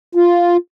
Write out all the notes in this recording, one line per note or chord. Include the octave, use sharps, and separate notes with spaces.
F4